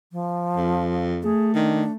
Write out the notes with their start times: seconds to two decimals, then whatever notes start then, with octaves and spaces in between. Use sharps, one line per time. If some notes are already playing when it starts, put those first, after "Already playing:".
0.12 F3
0.56 F2
1.23 A3 G#4
1.55 D#3 D4